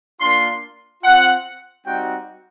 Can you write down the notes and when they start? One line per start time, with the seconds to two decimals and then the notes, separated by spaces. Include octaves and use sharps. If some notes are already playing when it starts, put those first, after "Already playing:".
0.20 A#3 D4 F4 C6
1.02 C4 F4 F#5
1.84 G3 C4 D#4 F#4 G5